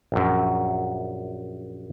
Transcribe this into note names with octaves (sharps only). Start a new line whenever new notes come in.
A#1 F#2